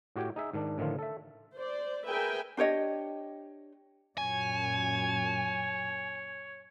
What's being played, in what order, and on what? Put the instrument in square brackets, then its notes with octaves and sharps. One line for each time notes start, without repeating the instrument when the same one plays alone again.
[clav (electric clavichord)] A2 F#4 G4 C#5 G5
D#4 G#4 E5
G#2 D#3 D4
A2 D3 D#3 F3 F4
A4 E5
[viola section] C5 D5
G#4 A#4 B4 E5 G5 G#5
[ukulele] D4 G4 C#5 D#5
[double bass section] F#2 A#2 [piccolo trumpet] C#5 [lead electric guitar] G#5